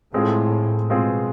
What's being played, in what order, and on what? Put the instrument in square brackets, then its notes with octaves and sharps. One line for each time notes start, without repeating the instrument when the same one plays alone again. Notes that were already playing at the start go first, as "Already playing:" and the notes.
[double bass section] A2 [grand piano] G#3 C4 F4 G#4
[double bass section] B2 [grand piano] G#3 C4 F4 G#4